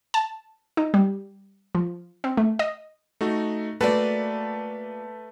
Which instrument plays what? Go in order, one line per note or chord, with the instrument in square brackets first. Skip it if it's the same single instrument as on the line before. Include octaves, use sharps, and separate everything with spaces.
[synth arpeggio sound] A5
D#4
G3
F3
C4
A3
D#5
[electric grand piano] A3 D#4 F#4
[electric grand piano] A3 B4 A5 [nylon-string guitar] A#3 F#4 D5